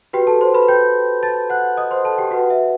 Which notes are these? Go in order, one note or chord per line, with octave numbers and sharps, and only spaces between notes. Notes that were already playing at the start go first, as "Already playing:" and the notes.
F#4 G4 B4 G5
A4 A5
C5 C6
B4 B5
G5 G6
A5 A6
F#5 F#6
D#5 D#6
C5 C6
A4 A5
G4 G5
F#4 B4 F#5
E5